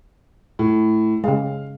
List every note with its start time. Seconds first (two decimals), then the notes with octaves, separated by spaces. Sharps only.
0.59 A2
1.24 C#3 G#3 F5